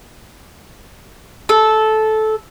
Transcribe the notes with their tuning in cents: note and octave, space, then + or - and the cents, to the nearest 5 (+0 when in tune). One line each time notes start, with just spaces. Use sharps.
A4 -15